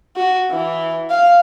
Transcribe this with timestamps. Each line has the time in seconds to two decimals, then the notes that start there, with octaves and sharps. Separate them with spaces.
0.16 F#4
0.51 E3
1.10 F5